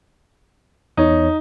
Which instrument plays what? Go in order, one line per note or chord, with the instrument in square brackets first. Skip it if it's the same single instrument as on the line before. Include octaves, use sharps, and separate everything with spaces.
[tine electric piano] E2 C#5 [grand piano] D#4